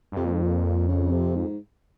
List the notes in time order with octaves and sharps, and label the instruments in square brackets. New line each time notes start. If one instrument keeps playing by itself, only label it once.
[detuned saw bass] G2
[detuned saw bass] F2 [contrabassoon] C3
[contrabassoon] A#2
G#2
A#2
C#3
C3
G#2